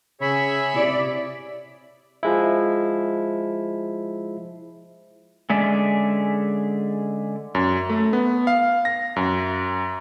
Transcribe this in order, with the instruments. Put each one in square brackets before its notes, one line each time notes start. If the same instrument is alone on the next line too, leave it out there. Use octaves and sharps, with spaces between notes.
[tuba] C#3 [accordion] G#4 C#5 E5 [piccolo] B5
[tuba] C3 [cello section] E4 D5
[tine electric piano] F3 G#3 E4
[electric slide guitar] D3 G#3 C#4 G#4 D5 E5
[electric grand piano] F#2
A3
B3
F5
A#6
F#2